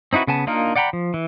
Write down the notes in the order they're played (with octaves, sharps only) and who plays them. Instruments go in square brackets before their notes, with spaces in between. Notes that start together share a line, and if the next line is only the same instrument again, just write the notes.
[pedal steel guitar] C4 D#4 E4 F#4 B4
C#3 B3 G#5 A5
A#3 D4 D#4 F4 A#4
D5 F#5 G5 A#5 B5
F3
E3